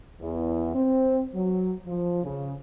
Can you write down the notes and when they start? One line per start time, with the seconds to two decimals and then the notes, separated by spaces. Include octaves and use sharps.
0.20 E2
0.75 C4
1.34 F#3
1.87 F3
2.23 C#3